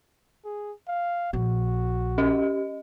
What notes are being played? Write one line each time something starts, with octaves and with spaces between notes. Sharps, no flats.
G#4
F5
A#1 F#4
C#4 G4 D#5